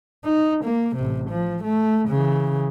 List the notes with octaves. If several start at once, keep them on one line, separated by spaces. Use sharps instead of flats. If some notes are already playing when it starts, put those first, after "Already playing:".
D#4
A#3
A1 C3
F3
A3
C#3 E3